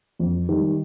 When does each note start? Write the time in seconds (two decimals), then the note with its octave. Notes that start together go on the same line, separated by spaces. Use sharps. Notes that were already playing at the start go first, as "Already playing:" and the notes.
0.19 F2
0.49 D#3 G3